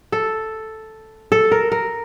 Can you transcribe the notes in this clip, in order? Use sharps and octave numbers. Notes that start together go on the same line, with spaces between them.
A4
A4
A#4
A#4